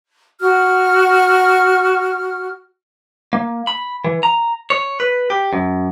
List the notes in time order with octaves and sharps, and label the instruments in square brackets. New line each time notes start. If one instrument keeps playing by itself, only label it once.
[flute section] F#4 F6
[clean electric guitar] A#3
B5
E3
A#5
C#5
B4
G4
F#2